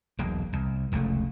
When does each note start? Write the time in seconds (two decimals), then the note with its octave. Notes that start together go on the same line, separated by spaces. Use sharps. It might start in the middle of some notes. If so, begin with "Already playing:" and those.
0.19 E1 B1 A#3
0.53 C2
0.92 F1 C#2 B2 A3